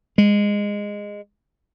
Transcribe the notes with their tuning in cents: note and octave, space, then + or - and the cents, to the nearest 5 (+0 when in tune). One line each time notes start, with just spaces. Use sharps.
G#3 -15